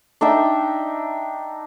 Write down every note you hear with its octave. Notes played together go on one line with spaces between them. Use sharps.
D4 D#4 E5 G5